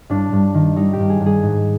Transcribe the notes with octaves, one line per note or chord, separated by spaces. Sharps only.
G2 D4
G2
D#3
G3 D#4
G4
G2
G#4
G2
G#4
G#2